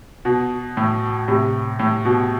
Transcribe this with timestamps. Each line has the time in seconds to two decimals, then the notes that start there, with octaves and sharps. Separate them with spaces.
0.25 B2
0.77 A2
1.28 A2 C3
1.79 A2
2.05 B2